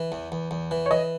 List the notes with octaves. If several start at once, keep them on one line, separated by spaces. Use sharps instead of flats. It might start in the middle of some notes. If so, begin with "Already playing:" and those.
Already playing: E3
E2
E2
E2
E3
C#5
E3 D#5